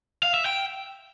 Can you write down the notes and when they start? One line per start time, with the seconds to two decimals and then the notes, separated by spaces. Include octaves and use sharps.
0.23 F5
0.34 E5
0.46 G5